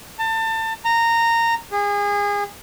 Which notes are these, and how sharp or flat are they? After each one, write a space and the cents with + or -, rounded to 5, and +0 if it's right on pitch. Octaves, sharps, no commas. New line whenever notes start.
A5 +30
A#5 -15
G#4 -30